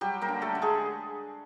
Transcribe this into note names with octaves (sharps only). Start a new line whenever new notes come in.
F#3 G3 G4
A#3 A#4
D3
A3 A4
D3
G#3 G#4